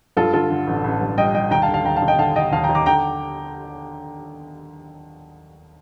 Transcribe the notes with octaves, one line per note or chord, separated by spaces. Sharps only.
G2 F4 A4
D3 F4 A4
D3
A1
A1
G2
G3 D#5 G5
G3 D#5 G5
D#2 G5 A#5
F5 A5
D3
F5 A5
D#2 G5 A#5
F5 A5
D#2
D#5 G5
D3 F5 A5
D3 D#5 G5
D#2 F5 A5
G5 A#5
D#2
A#5 D6
D3 G5 A#5